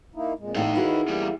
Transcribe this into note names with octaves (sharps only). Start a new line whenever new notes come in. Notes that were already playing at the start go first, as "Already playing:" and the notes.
A#3 D#4 E4
F2 A#2 G#3
E2 A2 D#4 D#5 F5
D#3 E4 F#4 G#4 B4
E2 G3 A#3